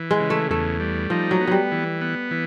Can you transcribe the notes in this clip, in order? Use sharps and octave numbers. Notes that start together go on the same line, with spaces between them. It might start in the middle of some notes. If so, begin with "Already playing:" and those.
Already playing: E3
G#3
C#3
A3
E2 A3
G3
F3 D#4
F#3
B3
F#3 G3
E3
B3
E3